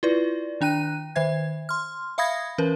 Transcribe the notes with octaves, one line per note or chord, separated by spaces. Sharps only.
E4 F4 B4 D5
D#3 D4 G5 F#6 D#7
D#3 C5 E5 G#6
C6 F6
E5 F5 B5 D#6 G#6 A#6
E3 C#4 A#4 B4